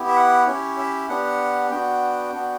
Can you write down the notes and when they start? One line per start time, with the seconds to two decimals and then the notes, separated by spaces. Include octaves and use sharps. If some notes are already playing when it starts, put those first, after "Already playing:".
Already playing: B3 E4 G4
0.08 E5
0.16 F#5
0.47 C#4 E4 G4 C#5
0.78 E5
1.09 B3 D4 G4 F#5
1.71 B3 D4 F#4 G5
2.34 B3 D4 F#4